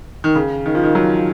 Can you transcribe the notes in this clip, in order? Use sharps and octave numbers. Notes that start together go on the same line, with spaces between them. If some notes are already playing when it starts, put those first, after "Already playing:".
D#3
C#3
D#3
F3
D#3
F#3